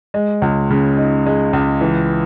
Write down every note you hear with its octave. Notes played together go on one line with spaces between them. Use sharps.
G#3
C#2
C#3
D#4
G#3
C#2
E3